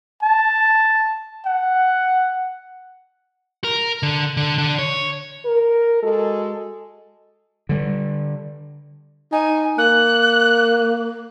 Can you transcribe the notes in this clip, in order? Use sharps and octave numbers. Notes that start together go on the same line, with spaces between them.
A5
F#5
A#4
D3
D3
D3
C#5
A#4
G#3 F#4 A4
D3 G3
D#4 G#5
A#3 F#6